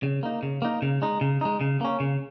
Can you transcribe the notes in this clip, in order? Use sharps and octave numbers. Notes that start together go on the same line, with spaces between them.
C#3
A#3 D#4
C#3
A#3 D#4
C#3
G#3 D#4
C#3
G#3 D#4
C#3
A#3 C#4
C#3